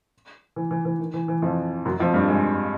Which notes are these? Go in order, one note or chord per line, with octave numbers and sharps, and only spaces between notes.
E3
E3
E3
D#3
E3
E3
F2 F3
F#2 F#3
F2 F3
G2 G3
G#3